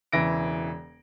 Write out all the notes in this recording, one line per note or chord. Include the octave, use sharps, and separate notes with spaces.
E1 C#3 E3 A#6 D7